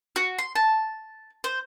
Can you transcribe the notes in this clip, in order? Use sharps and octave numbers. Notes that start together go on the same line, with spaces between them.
F#4
C6
A5
C5